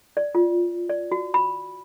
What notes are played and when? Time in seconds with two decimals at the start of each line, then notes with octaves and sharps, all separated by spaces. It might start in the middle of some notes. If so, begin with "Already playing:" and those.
0.17 D5
0.35 F4
0.89 D5
1.12 F#4
1.34 B5